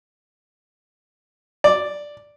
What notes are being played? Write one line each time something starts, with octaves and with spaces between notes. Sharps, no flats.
D5